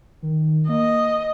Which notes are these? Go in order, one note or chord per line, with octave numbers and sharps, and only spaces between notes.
D#3
A#3 D#5